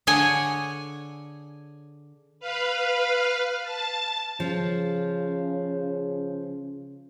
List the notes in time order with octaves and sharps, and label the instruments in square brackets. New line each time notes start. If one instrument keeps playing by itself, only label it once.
[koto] D3 G#4 C#5 G#5
[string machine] B4 F5 F6
A5 A6
[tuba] C#3 [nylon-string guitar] F3